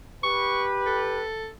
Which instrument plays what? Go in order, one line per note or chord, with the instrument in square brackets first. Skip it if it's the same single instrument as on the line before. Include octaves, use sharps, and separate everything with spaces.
[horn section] G4 B4 [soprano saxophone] C#6
[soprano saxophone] A4